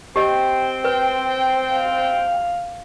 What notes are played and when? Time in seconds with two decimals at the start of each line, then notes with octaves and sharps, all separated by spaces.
0.16 C4 G4 C5 D#5 G5
0.84 B4
1.73 F5